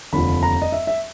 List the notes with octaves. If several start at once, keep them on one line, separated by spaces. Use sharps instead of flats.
F1 D#2 D3 F3 B5
A#5
D#5
E5
E5